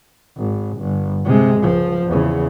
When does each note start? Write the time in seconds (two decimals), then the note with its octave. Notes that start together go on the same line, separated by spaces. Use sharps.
0.37 G#1
0.78 G1
1.25 C3 G#3
1.60 C#2 F3
2.05 E2 C#3